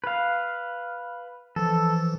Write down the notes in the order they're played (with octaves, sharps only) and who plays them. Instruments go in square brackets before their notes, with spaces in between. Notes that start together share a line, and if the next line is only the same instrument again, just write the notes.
[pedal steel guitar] B4 F5
[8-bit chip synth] E3 F3 [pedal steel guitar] A4